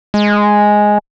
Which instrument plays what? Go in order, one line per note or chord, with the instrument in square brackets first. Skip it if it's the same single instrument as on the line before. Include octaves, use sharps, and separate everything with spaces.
[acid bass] G#3